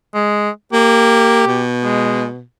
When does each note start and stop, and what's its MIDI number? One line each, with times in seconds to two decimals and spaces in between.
0.15 0.50 56
0.73 1.47 58
0.73 1.63 67
1.47 2.43 47
1.84 2.28 56